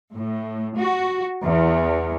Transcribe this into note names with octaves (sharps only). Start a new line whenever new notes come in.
A2
F#4
E2